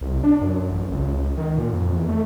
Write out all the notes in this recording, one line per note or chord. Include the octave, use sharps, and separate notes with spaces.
C2
D4
F#2
A1
C#2
D#3
A#2
F2
E2
A3